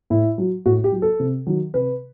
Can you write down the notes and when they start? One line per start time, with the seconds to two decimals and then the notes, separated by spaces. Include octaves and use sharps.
0.10 A2 E4
0.38 F#3
0.66 A2 F#4
0.84 G4
0.92 F#3
1.02 A4
1.20 C3
1.47 D#3 F#3
1.74 C3 B4